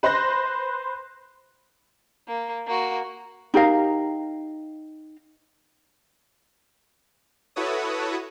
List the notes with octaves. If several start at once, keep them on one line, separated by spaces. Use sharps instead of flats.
B4 C5 C6 F#6 A#6
A#3
A#3 F#4
D#4 G4 A#4 F5
E4 F#4 A4 B4 C#5 D#6